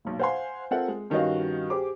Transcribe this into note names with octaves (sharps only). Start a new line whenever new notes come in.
B1 A#2
C5 F5 F#5 G#5 C6
C4 F4 A4 A#4 E5 F#5
G#3
G2 D#3 C#4 F#4 D#5 F5
G4 G#4 C5 D6